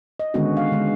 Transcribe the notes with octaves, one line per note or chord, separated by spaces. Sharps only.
D#5
D3 D#3 G#3 B3 C#4 F#4
F5
D3 G#3